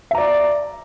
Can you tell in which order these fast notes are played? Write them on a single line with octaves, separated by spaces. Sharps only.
E5 A#5 D5